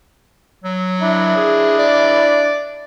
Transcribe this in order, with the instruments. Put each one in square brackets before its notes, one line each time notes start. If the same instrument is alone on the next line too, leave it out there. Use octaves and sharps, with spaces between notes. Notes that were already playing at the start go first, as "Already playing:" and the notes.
[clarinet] F#3
[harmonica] D4 E4
[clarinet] G#4
D5